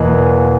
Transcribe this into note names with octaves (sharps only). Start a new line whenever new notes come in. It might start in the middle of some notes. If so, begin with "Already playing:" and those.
Already playing: E2 B2 A#3 D#5 F#5 G#5